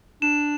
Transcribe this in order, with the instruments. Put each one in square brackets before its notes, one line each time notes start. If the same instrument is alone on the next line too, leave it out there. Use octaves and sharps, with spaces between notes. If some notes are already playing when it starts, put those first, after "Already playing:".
[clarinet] D4 [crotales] E7